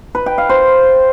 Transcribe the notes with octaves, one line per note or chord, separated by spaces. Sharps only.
B4
G5
F5
C5